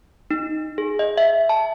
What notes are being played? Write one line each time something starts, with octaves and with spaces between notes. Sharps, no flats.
D#4
G#4
D#5
E5
A5